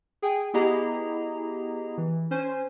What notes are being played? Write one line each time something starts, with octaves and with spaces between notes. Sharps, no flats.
G#4 G5 G#5
B3 E4 G4 G#4 D#5 A#5
E3
C#4 C5 G#5